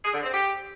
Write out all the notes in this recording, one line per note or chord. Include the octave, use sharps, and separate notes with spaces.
G#4
D3
C4
G4